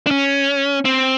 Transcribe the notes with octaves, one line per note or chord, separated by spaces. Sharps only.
D4
C#4
C4